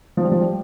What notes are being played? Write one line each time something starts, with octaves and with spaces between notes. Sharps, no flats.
F3
G3
F3
G3